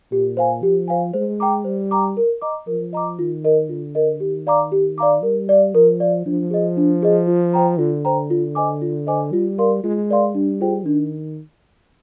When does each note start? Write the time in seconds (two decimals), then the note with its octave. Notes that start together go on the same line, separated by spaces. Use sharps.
0.11 A#2 G4
0.37 C5 F5 G#5
0.62 F3 G4
0.88 C5 F5 G#5
1.14 G#3 C5
1.40 G5 A#5 D6
1.64 G3 C5
1.91 G5 A#5 D6
2.17 A#4
2.42 D#5 A#5 D6
2.67 F3 A#4
2.93 D#5 A#5 D6
3.19 D#3 F4
3.44 A#4 D#5
3.69 D3 F4
3.95 A#4 D#5
4.20 D#3 G4
4.47 D5 F5 A#5 D6
4.72 G4
4.98 D5 F5 A#5 D6
5.23 G3 A#4
5.49 D5 F5
5.75 F3 A#4
6.00 D5 F5
6.26 F3 D4
6.51 G#4 D#5
6.77 D4
7.03 G#4 D#5
7.27 F4
7.54 C5 G5 A#5
7.79 D3 F4
8.05 C5 G5 A#5
8.30 F4
8.55 C5 D#5 G#5 D6
8.82 F4
9.07 C5 D#5 G#5 D6
9.33 G3 F4
9.58 A#4 D5 F5 C6
9.83 G#3 F4
10.09 A#4 D5 F5 C6
10.35 G3 D4
10.61 F4 G#4 C5 G5
10.86 D#3 D4